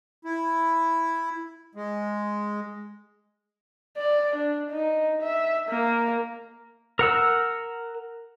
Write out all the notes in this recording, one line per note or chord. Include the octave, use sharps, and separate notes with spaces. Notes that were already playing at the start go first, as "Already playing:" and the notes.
E4
G#3
D5
D4
D#4
E5
A#3
A#4 F#5 E6